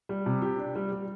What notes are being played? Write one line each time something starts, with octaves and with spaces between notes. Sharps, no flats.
G3
C3
G4
D4
G3
G3